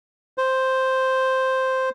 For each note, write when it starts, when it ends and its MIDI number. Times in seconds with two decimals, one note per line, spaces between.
0.38 1.89 72